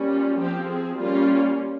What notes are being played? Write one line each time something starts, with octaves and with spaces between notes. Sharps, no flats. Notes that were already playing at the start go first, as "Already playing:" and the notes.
Already playing: G3 A#3 C#4
F4
F3 C4 G4
G#4
G3 A#3 C#4 F4